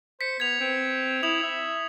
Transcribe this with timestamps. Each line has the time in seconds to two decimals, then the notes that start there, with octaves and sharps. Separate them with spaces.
0.21 C5 B6 C#7
0.40 B3 G#6 F7
0.61 C4
1.23 E4 D#6 F7 F#7
1.43 E5